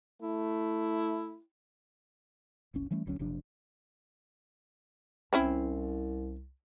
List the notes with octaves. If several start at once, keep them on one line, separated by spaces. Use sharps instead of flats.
A3 E4
F#1 C2 C#4
E3 G3 A3 C#4
G1 D2 F#3 C#4
F#1 C3 F3 D4
C2 C4 C#4 E4